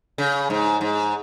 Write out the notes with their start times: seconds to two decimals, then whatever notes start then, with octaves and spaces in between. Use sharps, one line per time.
0.18 C#3
0.50 G#2
0.81 G#2